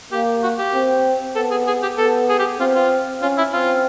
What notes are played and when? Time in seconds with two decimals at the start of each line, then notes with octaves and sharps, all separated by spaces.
0.12 A#3 G4
0.43 F#4
0.59 G4
0.74 C4
1.36 B3 A4
1.51 G#4
1.67 G#4
1.83 G4
1.98 B3 A4
2.29 G#4
2.39 G4
2.60 C4 F4
2.75 F4
3.22 C#4 F4
3.38 E4
3.53 C4 F4